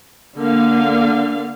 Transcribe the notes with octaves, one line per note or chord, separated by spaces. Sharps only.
D3 A#3 F5